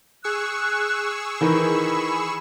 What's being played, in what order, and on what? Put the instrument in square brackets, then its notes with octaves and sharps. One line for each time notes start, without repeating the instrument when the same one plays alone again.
[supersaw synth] G#4 C#6 E6 [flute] F#6
[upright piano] D#3 E3 A#4 [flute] B5